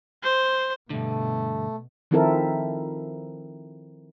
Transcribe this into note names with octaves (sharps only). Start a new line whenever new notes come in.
C5
G2 B2 D3 A3
D#3 F3 C4 E4 A4 A#4